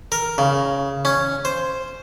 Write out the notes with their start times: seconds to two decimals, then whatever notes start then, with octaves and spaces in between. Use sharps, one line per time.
0.12 A#4
0.38 C#3
1.05 C#4
1.45 C5